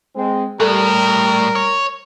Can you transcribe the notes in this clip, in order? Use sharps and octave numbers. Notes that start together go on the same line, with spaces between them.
G#3 C4
A2 G3 A4 A#4
C#5